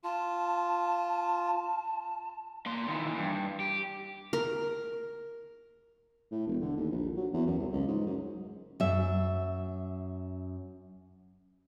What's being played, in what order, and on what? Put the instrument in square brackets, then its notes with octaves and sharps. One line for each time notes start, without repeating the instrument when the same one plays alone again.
[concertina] F4 [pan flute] A5
[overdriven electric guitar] A#3 C6
D#3 E3
G2
G4
[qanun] A#4
[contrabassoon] A2
E1
D3
D#2
A#1
F#3
E2
F#2
C2
C#2
G#2
F#2
[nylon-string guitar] F#2 E5